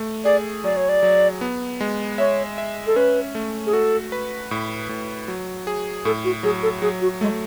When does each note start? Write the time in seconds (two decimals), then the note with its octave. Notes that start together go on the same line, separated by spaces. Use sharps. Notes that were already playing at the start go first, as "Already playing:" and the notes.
Already playing: A3
0.25 G#4 D5
0.64 F#3 D5
0.77 C#5
0.89 D5
1.03 F#3
1.41 B3
1.81 G#3
2.18 C#5 E5
2.58 E5
2.87 A4
2.96 C#4 B4
3.35 A3
3.67 G#4
3.73 F#4 A4
4.12 B4
4.51 A2
4.89 A2
5.28 F#3
5.67 G#4
6.05 A2 A4
6.25 F#4
6.43 F#3 G#4
6.63 A4
6.82 F#3 G#4
7.02 F#4
7.21 G#3 A3